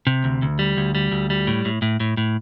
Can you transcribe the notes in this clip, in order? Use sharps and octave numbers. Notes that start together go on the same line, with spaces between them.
C3
D2
D2
G3
D2
G3
D2
G3
A2
A2
A2
A2
A2